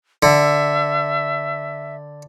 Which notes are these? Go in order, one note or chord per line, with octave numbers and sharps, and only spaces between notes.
D3 E5